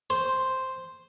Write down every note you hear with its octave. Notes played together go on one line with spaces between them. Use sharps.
C5